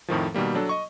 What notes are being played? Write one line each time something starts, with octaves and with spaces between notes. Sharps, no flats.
F2 A2 D#3 F3
B2 D#3 G3 A#3
F#3 D4 A4
D#5 C#6